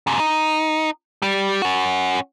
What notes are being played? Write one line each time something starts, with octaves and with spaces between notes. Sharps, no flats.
F#2 C3
D#4
G3
C#4 F#4